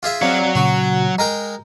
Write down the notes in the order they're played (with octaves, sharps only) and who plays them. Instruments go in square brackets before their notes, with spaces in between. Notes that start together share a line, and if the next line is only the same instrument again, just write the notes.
[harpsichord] F4 G#4 E5
[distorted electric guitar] F#3 C#5 [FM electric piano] C4 D5 F5
[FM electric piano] A#2 C#3 [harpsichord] F#4
[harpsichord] G#3 A#4 G5 [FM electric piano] A#5